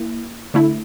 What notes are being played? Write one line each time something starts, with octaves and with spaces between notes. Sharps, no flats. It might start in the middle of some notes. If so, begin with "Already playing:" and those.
Already playing: A#3 E4
D3 A3 E4